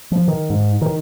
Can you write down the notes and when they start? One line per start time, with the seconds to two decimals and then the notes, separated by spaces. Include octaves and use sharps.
0.11 F3
0.28 D#3
0.50 G#2
0.81 D#3